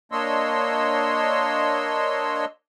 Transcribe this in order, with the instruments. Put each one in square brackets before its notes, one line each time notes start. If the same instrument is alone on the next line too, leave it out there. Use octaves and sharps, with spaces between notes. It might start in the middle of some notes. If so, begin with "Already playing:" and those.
[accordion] A#3 D4 C#5 D#5 C6 E6